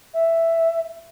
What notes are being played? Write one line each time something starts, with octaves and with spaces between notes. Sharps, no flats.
E5